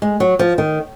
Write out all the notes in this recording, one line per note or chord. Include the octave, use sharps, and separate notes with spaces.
G#3
F#3
F3
D#3